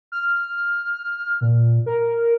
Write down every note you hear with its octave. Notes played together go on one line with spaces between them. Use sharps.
F6
A#2
A#4